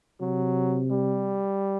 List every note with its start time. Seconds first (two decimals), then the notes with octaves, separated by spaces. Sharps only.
0.21 C3 F#3
0.91 G3